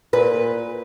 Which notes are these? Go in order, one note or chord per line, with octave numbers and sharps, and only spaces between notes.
A#2 B4